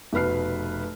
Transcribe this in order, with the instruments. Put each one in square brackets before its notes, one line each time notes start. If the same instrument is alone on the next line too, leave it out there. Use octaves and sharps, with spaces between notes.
[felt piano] F1 B2 B4 F6 C7